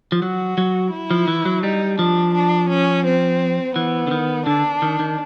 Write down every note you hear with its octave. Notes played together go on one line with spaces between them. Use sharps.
F3
F#3 F#4
F#3
E4
F3
E3
F#3
G3 D#4
F3 D4
D4
C#4
C4
E3 B3
D3
D#3
D3 D4
D#3
D#3